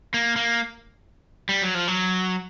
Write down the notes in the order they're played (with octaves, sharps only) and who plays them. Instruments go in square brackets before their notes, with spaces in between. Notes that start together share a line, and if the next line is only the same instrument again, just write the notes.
[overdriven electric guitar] A#3
A#3
G3
F#3
F3
F#3